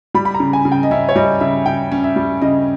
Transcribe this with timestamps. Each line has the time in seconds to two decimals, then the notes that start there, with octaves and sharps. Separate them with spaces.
0.14 G3 B5
0.25 B5
0.34 A#5
0.40 C#3
0.53 G#5
0.65 C#3
0.72 G5
0.83 D#5
0.91 C#4 E5
1.09 C#5
1.16 G3 D#5
1.40 C#3 E5
1.66 C#3 G5
1.92 C#4
2.04 E5
2.16 G3
2.42 C#3 D#5